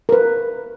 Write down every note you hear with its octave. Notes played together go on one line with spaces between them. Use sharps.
A#4
B4